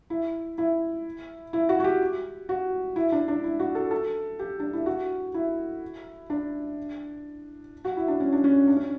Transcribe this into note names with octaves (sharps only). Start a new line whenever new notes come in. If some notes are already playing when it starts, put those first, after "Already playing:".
E4
E4
E4
F#4
F#4
G4
F#4
E4
D4
D4
E4
F#4
A4
A4
G4
D4
E4
F#4
E4
D4
F#4
E4
D4
C#4
D4
C#4
D4
C#4